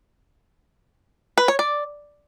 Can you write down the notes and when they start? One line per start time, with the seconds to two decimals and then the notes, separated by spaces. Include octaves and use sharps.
1.38 B4
1.48 C#5
1.59 D5